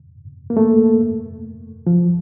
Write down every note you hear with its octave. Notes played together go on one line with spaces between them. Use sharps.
A#3
A3
F3